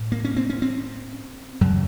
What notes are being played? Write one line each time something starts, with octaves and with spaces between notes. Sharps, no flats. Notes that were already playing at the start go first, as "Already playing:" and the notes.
Already playing: A2
A#3
C#4
C4
C#4
C4
F#2 C#3 F#3